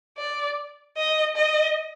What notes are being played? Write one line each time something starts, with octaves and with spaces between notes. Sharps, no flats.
D5
D#5
D#5